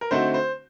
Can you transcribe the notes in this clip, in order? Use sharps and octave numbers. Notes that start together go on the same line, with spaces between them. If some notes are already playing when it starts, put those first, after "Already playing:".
A#4
D3 A3 C4 D#4 F#4 C5
C5